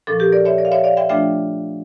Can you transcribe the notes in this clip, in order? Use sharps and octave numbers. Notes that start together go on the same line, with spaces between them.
A#2 F3 C#4 A4
G4 A#4
A#4 D5
C#5 E5
A#4 D5
F5
C#5 E5
D5 F5
E5 G5
F3 A3 D4 F4 E5 G5